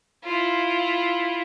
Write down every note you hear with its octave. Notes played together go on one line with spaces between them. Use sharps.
E4 F4